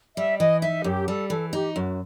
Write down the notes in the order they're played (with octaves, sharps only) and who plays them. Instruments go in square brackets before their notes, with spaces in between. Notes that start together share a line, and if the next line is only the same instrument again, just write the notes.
[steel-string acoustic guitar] G3 [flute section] E5
[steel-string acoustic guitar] E3 [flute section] D#5
[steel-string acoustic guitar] D#4 [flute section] E5
[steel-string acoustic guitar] F#2 [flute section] G4
[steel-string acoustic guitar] G3 [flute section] A4
[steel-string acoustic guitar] E3 [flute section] A4
[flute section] A4
[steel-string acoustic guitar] D#4 [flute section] G4
[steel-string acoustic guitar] F#2 [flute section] F#4